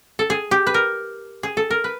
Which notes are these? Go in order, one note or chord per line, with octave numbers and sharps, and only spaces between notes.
A4
G#4
G4
B4
A#4
G#4
A4
A#4
B4